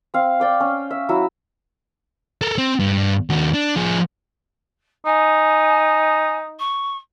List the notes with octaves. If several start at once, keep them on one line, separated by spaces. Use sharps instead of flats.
C4 F5
D5 G5 D6
C#4
E5
F#3 E4 F#4 E6
A4 A#4
C4
G2
D#2 F#4
D4
F3 G#4
D#4 G#5
C#6